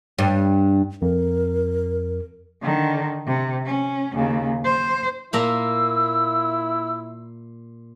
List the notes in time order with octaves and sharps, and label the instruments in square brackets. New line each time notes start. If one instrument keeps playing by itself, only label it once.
[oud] G2
[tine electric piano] F2 [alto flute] A#4
[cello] D3 D#3
C3
C#4
D#2 C#3
C5
[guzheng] A#2 A#3 A#5 [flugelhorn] E4 [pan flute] E6